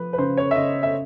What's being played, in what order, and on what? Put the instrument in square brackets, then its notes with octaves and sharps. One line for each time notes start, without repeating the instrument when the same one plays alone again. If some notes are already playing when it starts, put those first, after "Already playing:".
Already playing: [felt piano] F3 [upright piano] B4
[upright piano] B4
[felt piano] C#3 [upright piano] C5
[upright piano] C#5
E5
[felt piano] C#3 [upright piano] D#5
[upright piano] E5